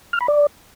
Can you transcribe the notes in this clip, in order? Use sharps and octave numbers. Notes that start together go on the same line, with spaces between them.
F6
B5
D5